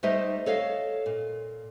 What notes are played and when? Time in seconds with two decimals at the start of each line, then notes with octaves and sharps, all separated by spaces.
0.03 G3 A3 D#4 C5 D#5 E5
0.46 A4 C#5 D#5 F5
1.06 A#2